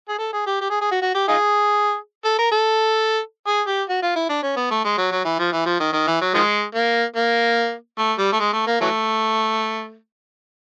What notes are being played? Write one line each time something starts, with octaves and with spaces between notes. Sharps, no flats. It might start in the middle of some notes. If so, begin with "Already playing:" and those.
G#4
A4
G#4
G4
G4
G#4
G#4
F#4
F#4
G4
D#4 F4 G#4
A4
A#4
A4
G#4
G4
F#4
F4
E4
D4
C#4
B3
A3
G#3
F#3
F#3
E3
F3
E3
F3
D#3
D#3
E3
F#3
D#3 F3 G#3
A#3
A#3
A3
G3
A3
G#3
A3
A#3
E3 F#3 A3